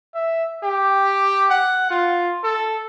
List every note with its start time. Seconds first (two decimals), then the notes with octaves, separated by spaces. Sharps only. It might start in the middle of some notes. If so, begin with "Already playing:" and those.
0.15 E5
0.63 G4
1.50 F#5
1.91 F4
2.44 A4